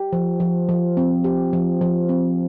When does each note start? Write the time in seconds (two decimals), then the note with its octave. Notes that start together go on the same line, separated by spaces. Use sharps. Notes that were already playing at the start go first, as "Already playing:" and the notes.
Already playing: G4
0.13 F3
0.40 F3
0.69 F3
0.97 C4
1.24 G4
1.53 F3
1.81 F3
2.09 C4